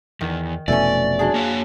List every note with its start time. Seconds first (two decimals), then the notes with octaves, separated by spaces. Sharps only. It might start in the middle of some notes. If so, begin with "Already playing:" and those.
0.21 E2 D#3
0.68 F1 B2 E3 A3 C#4 D5
1.19 F#3 D4 G#4
1.34 A#3 C#5 F5